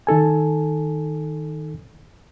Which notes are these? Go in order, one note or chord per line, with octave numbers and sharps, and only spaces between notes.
D#3 D#4 A4 G#5